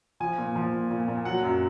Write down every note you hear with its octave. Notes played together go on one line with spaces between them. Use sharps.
F3 G#5
A#2
F3
A#2
A#2
A#2
F#3 F#5
F#2